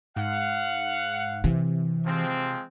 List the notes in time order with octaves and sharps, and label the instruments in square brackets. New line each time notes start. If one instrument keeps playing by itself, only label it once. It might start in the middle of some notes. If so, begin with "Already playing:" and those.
[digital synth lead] G#2 [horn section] F5 F#5
[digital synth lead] C3 [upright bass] E3
[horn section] F3 G#3 C4